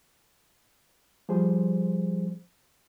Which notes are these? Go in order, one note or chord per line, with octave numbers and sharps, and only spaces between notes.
F3 G3 G#4 C5